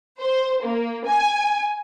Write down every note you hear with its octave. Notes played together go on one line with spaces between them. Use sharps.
C5
A#3
G#5